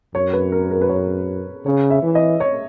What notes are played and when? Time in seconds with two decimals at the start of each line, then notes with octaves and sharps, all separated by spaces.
0.15 F#2 C#5
0.33 B4
0.52 A#4
0.71 A#4
0.81 B4
0.89 C#5
1.66 C#3 C#5
1.91 E5
2.03 E3
2.15 D#5
2.40 C#5